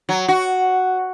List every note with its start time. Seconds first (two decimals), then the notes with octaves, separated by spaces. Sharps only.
0.09 F#3
0.28 F#4